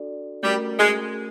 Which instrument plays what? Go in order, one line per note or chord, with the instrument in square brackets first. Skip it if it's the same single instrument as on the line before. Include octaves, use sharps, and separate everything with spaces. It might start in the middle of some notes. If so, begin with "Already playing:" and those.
Already playing: [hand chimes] D4 F#4 A4 D5
[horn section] G3 [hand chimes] A3 C#4 F#4 A#4
[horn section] G#3